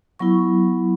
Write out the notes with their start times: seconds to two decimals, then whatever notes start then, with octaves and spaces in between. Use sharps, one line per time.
0.19 F#3 B3 E4 C#6